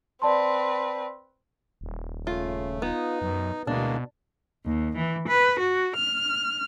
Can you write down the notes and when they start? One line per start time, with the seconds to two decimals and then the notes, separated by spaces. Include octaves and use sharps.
0.22 C4 B4 D5 A5 C6
1.81 D#1
2.27 C#3 A3 F4
2.82 B3 D#4 F4
3.22 F#2 B2
3.67 D2 B2 E3 G#3 A#3 D4
4.66 D#2
4.96 E3
5.27 B4
5.58 F#4
5.95 F6